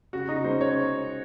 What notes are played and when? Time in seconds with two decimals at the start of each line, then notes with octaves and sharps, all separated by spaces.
0.13 C#3 F#4
0.28 D#4
0.44 G#3 C#4 C5
0.61 C#5